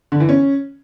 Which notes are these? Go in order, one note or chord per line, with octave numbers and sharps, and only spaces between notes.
D3
E3
C#4